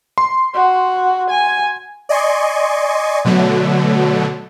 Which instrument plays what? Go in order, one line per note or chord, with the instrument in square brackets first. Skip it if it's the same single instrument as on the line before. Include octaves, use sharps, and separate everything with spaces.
[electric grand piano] C6
[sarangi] F#4
G#5
[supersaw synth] D5 D#5 G#5 C6 C#6
B2 D3 F#3 A3